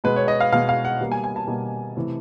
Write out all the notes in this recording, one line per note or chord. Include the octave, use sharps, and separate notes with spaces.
B2 G#3 B4
C#5
D#5
F5
B2 G#3 F5
F5
F#5
B2 G3 A#3
G#5
G#5
A5
B2 G3 A#3
C3 E3 A3